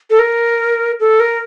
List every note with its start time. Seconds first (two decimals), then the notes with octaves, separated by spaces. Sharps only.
0.10 A4
0.19 A#4
1.00 A4
1.20 A#4